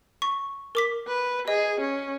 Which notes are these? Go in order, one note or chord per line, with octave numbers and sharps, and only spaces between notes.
C#6
A#4 D6 B6
B4
G#4 D#5
C#4